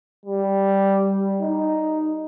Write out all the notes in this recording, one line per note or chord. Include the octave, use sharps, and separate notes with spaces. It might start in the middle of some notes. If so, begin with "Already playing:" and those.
G3
D#4